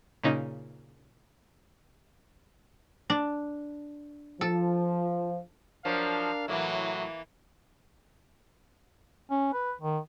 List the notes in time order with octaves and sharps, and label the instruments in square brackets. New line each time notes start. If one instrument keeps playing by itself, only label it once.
[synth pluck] A#2 C#3 C#4 D#4
[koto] D4
[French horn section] F3 [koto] A4
[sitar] F3 F#3 [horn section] D4 A#4 F5
[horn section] A2 F#3 [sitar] E3 A#3 E4
[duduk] C#4
B4
D#3